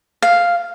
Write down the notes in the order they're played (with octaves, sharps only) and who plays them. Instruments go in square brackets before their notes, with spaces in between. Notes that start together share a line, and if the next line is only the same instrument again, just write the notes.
[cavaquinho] F5